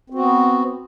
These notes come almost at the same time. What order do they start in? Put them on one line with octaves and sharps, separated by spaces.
C4 F#4 B3